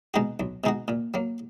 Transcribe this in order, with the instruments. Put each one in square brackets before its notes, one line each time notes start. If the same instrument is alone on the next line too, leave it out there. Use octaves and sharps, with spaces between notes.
[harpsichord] B2 G#3 D#4 F#4
B1
B2 G#3 D#4 F#4
A#2
F#3 A#3